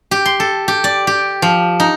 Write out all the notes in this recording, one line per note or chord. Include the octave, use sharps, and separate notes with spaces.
G4
C6
A4
G4
D5
G4
F3
D#4